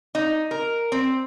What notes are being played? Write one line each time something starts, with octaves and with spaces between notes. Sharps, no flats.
D#4
A#4
C4